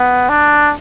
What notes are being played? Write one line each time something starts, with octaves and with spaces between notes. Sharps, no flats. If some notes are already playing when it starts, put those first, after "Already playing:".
Already playing: B3
D4